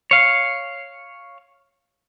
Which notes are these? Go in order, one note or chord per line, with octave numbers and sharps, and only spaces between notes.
C#5 F5